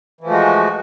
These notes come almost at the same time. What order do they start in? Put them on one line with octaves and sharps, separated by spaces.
E3 F3 A3 G#3 F#4